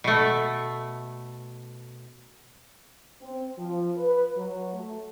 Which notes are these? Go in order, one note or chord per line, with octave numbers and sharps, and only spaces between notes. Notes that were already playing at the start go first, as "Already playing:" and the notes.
B2 A3
C4
F3
B4
F#3
A3